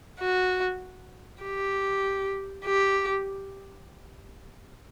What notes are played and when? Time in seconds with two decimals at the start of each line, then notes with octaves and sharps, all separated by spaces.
0.20 F#4
1.43 G4
2.65 G4